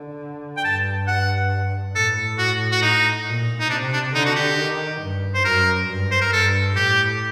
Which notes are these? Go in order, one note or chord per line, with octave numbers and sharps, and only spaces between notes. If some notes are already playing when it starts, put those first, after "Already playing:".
Already playing: D3
G5
G2 A5
F#5
A2 A4
F#4
F#4
D#4
A#2
D#4
C3 D4
D4
D3 D#4
F#4
G4
D#3
G2
C5
F#2 A#4
G2
C5
A#4
G2 A4
A2 G4